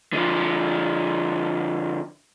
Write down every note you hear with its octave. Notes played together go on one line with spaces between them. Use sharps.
D3 F3